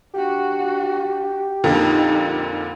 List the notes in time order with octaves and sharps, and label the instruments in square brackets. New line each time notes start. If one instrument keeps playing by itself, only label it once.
[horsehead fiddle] D4 F#4 [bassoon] G4
[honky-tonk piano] F2 A#2 D3 [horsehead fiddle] D#4